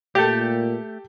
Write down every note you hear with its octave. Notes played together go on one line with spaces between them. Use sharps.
A#2 A3 G4 A4